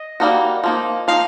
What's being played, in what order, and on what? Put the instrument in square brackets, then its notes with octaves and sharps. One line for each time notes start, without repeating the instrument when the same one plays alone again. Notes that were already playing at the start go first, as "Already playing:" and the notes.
Already playing: [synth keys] D#5
[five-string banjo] G3 A#3 D#4 F#4
F3 A#3 D#4
[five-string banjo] F3 A#3 D#4 [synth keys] F5